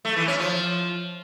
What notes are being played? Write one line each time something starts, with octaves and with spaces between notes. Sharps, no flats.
A3
E3
C#4
F3